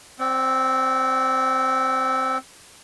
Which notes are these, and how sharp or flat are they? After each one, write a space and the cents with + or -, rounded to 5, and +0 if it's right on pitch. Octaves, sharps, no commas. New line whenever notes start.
C4 +5 D5 -10 G5 -45